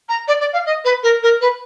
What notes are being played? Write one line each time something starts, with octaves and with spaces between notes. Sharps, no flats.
A#5
D5
D5
F5
D#5
B4
A#4
A#4
B4